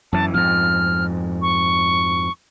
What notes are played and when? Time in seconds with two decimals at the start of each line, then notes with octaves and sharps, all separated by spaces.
0.13 F#2 E3 A5
0.34 F2 G#2 F6
1.42 C#6